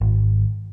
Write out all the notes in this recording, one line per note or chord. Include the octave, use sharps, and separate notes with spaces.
G#1